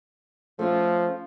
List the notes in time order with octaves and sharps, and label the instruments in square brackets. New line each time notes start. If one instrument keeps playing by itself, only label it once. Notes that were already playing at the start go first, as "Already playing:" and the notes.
[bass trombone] F3 [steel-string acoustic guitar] A3 C#4 F4